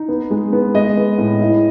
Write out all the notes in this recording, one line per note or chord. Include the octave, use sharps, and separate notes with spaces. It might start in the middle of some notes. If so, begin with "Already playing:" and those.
Already playing: D#4
B3
G#3
B3
G#3 D#5
B3
A2
E4